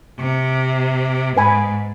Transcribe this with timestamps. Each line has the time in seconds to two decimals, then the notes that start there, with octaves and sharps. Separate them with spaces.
0.19 C3
1.36 G#2 B4 G#5 B5